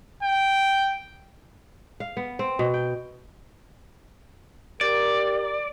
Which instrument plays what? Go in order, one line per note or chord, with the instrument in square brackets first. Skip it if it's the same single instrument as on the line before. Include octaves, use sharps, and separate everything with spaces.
[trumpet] G5
[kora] F5
B3
C4
B2
G5
[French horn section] G4 A#4 [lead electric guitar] D5